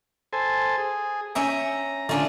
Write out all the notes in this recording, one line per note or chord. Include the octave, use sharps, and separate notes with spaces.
A4 C5 G#5
G#4
C#4 E5 G5 A#5
D3 A3 C#4 D4 F4